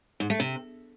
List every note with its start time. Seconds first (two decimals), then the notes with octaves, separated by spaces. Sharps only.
0.20 G#2
0.30 A3
0.40 C3